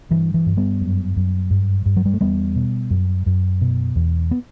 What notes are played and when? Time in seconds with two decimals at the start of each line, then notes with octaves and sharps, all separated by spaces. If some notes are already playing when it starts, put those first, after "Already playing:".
0.11 G2 E3
0.34 E3
0.46 G2
0.57 G3 B3
0.81 F#2
1.17 F#2
1.51 G2
1.86 G2
1.97 F#3
2.05 G3
2.13 A3
2.21 E2 G3 B3
2.56 B2
2.90 F#2
3.26 F#2
3.61 B2
3.96 E2
4.31 B3